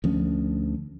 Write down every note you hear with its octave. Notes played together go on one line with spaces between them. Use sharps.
D2 F3 C#4